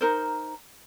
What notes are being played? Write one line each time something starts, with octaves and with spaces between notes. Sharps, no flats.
D#4 A#4 C5